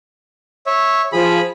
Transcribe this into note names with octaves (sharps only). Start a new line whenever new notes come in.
C#5 E5
F3 G#4 B5